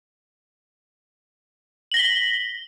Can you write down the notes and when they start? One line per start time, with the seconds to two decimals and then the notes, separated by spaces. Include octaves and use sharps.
1.91 F#7
1.94 A#6
1.97 G7
1.99 B6